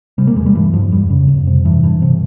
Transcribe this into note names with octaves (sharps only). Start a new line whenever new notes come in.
C3 G3
A#3
E2 G#3
G3
G2 E3
G2 F3
F2 G3
C#3
F2
C3
G2 E3
G2
C3